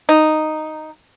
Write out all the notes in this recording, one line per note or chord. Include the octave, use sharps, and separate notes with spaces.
D#4